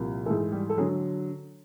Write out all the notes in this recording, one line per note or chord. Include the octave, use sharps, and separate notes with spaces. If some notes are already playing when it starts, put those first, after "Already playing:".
Already playing: C2 A#2 F3
G#2 E3 A3 A4
G3 G4
A4
D3 F#3 G#3 G#4